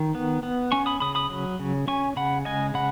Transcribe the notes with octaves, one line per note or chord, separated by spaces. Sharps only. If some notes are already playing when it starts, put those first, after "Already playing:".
Already playing: D#3
B3
B3
C#4 G#5 C#6
B5 D#6
C#3 B5 D#6
B5 D#6
F#3
C#3
C#4 G#5 C#6
C#3 F#5 B5
G#3 D#5 G#5
C#3 F#5 B5